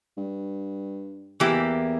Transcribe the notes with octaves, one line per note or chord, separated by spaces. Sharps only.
G2
E2 E3 A#3 E4 G4